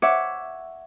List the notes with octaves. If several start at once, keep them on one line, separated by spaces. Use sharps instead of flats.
C#5 E5 F#5 D6